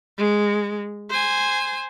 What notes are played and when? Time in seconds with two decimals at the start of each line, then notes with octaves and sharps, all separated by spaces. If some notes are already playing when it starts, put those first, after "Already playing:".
0.18 G#3
1.09 C5 G#5